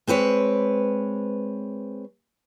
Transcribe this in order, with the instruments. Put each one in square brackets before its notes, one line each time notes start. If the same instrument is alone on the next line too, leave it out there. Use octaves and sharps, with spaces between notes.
[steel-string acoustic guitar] G#3 C4 B4 C#5